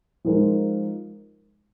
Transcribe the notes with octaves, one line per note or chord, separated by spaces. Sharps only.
F3 G#3 D#4 A#4